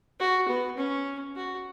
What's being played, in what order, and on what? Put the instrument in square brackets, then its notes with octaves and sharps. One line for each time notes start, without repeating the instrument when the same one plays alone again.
[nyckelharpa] F#4
B3
C#4
F#4